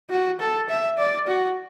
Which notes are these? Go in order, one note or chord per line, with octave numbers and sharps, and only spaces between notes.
F#4
A4
E5
D5
F#4